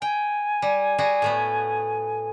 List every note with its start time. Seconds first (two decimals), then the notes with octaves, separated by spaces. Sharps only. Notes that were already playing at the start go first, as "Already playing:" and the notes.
0.02 G5 G#5
0.62 G3
0.98 G3 F#4 G#4
1.22 A2 A3 B3